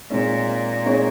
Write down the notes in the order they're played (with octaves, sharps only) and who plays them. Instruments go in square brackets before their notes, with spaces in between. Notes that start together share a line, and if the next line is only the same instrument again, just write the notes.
[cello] A#2 [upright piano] G#3 C4 D#4 G#4 C#5
[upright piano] G#3 C4 D#4 G#4 C#5